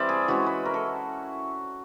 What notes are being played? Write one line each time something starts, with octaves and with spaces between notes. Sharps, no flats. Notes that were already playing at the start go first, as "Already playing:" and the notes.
Already playing: E3 G3 C4 D5 E5
G#4
E3 G#3 C#4 E4 F#4
B4
A#4
A4